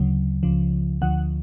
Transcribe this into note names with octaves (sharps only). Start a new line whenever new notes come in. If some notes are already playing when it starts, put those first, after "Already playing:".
Already playing: D2 C#3 F#3
C#2 C#3 F3
D2 D3 F3 F#5